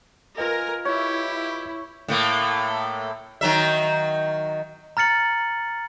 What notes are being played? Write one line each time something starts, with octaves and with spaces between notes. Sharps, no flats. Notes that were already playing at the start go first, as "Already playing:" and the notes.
F4 A#4 B4 D#5 G#5
E4 G4 C#5
A2 A3 A#3
D#3 F#3 E5
A#5 F6 A6 C#7 F#7